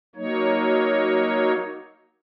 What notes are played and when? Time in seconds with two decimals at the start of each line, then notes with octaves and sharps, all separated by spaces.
0.16 F#3 A#3 D#4 C#5